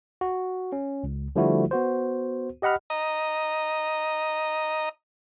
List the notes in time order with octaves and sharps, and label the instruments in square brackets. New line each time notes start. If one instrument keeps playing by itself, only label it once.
[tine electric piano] F#4
C#4
C#2
D3 F3 G3 A3 E4 F#4
B3 F#4 C5
G4 D#5 F#5 B5 F6
[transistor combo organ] D#5 A#5